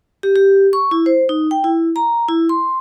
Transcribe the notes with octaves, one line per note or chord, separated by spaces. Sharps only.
G4
G4
C#6
E4
C5
D#4
G5
E4
A#5
E4
C6